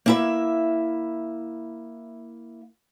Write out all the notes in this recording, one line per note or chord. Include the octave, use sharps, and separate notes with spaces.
A#3 E4 E5